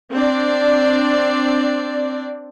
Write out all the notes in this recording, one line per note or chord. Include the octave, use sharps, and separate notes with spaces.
C4 D4 D5